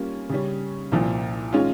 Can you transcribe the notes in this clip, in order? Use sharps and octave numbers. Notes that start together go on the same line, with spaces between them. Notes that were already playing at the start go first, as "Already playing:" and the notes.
Already playing: G3 A#3 C#4 F4
C#3 G3 C#4
C2 A#2 F3
D#3 G#3 C#4 F4